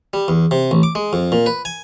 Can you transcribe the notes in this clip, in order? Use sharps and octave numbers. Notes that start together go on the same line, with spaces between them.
G3
E2
C3
A1
D6
G#3
F2
A#2
B4
G#5